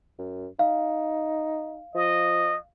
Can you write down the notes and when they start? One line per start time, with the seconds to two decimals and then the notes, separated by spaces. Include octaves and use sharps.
0.18 F#2
0.59 D#4 F5
1.95 F3 D#5